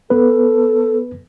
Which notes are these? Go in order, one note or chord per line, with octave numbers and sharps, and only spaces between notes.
B3 A4 B4